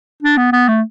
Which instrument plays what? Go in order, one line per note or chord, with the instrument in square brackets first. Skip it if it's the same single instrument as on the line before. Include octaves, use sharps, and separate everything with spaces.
[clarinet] D4
B3
B3
A3